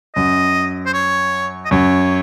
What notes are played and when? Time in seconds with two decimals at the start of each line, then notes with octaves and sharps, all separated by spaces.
0.15 F#2 D#5
0.86 C5
0.94 C#5
1.65 D#5
1.71 F#2 C#5